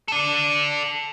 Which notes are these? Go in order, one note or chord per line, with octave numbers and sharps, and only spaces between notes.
A4 D5